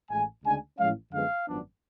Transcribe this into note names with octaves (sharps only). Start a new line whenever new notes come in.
A1 A2 G#3 G#5
D2 C#3 G#3 D4 G#5
A1 A2 F3 G#3 C#4 F5
F#2 D3 F3 G#3 B3 F5
G#1 F#2 F3 B3 D4